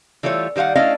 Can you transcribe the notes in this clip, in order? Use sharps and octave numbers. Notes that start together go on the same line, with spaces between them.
E3 G3 A3 F4 C#5
D#3 G3 C5 F5 F#5
A3 C#4 D4 E4 D#5 F5